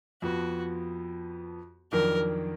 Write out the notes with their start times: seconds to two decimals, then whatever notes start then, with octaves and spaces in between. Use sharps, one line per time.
0.22 F2 F3 B3 F#4
1.92 F2 D#3 F#3 D4 A#4